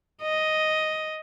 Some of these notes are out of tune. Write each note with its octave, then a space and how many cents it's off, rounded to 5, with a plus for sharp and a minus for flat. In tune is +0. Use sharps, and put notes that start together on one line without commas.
D#5 +5